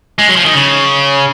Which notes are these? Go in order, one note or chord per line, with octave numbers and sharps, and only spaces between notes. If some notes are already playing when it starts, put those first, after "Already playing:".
G#3
F#3
F3
D#3
C#3